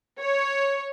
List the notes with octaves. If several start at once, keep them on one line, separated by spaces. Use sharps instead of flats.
C#5